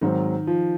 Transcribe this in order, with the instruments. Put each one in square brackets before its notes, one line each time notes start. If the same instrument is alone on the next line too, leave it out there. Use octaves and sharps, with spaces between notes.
[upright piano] G#2 F#3 C4 [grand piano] D#3
[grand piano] F3